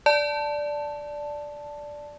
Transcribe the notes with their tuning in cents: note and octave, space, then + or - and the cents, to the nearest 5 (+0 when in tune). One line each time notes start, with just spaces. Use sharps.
D5 +0 A5 +0